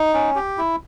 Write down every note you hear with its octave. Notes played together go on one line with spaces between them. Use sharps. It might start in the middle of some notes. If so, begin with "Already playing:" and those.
Already playing: D#4
C#4
G4
E4